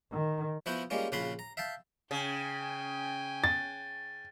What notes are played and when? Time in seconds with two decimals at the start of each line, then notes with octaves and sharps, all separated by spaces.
0.12 D#3
0.66 F3 B3 E4 F#4 G5 C#6
0.90 G3 G#3 A#3 C#4 F4
1.12 A#1 C#3 F4 F#4 B5 C6
1.39 A#5
1.57 E5 F5 G5 A5
2.11 C#3 G5 G#5
3.44 A6